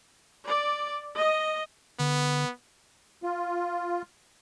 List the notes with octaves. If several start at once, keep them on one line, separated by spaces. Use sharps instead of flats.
D5
D#5
D3 B3
F4